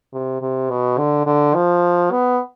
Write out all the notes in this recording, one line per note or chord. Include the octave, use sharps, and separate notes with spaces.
C3
C3
B2
D3
D3
F3
B3